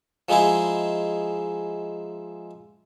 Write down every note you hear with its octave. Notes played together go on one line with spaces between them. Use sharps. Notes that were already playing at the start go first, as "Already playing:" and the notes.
F3 G#3 D#4 E4 G#4